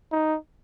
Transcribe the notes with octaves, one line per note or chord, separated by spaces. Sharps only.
D#4